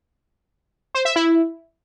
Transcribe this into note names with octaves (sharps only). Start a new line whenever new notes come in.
C5
E5
E4